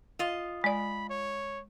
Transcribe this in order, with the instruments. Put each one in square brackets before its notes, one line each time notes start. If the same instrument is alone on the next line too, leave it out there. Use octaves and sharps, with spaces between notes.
[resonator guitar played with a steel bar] F4 D#5
[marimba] G#3 D5 [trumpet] B5
[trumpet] C#5